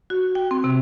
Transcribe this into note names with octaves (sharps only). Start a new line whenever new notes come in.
F#4
G5
C4
C3